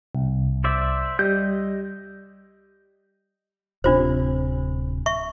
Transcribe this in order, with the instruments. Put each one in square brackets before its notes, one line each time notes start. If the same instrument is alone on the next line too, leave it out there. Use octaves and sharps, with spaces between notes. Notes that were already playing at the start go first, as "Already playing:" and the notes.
[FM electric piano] C2
[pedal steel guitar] C5 D5 E5
[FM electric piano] G3 [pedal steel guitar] D#5 G6
[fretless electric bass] D1 C3 [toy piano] D4 F4 C5
[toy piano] E5 C#6